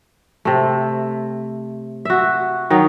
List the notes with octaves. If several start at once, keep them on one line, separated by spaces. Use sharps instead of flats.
C3 A3
F#4 E5
D#3 F#3 D#4